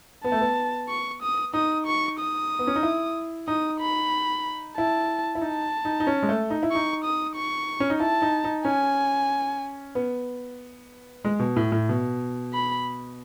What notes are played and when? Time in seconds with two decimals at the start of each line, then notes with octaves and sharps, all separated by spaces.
0.24 B3 A5
0.32 A3
0.41 B3
0.89 C#6
1.22 D#6
1.54 D#4 D#6
1.86 C#6
2.19 D#6
2.59 B3
2.67 C#4
2.76 D#4
2.83 E4
3.48 D#4 D#6
3.80 B5
4.77 E4 A5
5.35 E4
5.41 D#4 A5
5.85 D#4
6.00 D#4
6.07 C#4
6.23 G#3
6.29 A3
6.50 D#4
6.63 E4
6.71 D#4 C#6
7.04 D#6
7.36 C#6
7.80 C#4
7.90 D#4
8.00 E4 A5
8.22 D#4
8.44 D#4
8.65 C#4 G#5
9.95 B3
11.25 G#3
11.39 B2
11.56 A2
11.72 A2
11.89 B2
12.54 B5